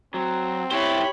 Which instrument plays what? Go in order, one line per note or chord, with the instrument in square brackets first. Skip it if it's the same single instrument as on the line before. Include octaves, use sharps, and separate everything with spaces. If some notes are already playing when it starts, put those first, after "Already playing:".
[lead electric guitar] F#3 [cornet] C4
[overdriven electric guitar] E4 C5 [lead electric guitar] G4 [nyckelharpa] C#5 B5